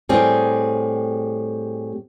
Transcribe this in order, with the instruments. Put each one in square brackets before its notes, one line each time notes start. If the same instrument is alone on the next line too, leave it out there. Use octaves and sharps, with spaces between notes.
[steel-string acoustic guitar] A2 G3 C4 G#4